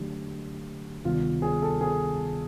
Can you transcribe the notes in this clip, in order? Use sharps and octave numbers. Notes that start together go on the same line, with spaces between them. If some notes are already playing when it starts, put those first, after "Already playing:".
Already playing: D3 F#3 A3 D4 G4
D2 C3 D#3 G3 B3 F4
G#4
A4
G#4